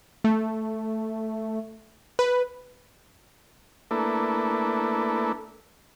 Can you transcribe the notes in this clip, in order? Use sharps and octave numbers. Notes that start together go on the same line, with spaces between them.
A3
B4
A3 A#3 D4 E4 A4 B4